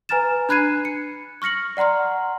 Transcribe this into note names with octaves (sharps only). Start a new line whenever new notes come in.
B4 G#5 A#5 F6 A6 E7
D4 B5 F#6 G#6 C7 D#7
C#7
C#6 F6 A#6 C#7 F#7
D5 F#5 A#5 C6 F6